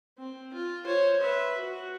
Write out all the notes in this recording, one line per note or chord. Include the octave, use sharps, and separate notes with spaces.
C4
F4
C5 C#5
B4 E5
F#4